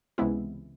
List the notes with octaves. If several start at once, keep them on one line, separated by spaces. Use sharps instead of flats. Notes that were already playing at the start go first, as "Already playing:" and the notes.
C#2 C3 E3 G#3 B3 E4